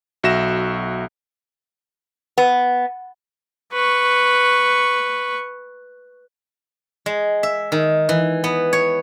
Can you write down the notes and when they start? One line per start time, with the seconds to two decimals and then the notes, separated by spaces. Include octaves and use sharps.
0.23 B1 F#4 E5 A#6 E7
2.38 B3
3.73 B4 C#6
7.06 G#3
7.43 E5
7.72 D#3
8.09 E3
8.44 B3
8.73 C#5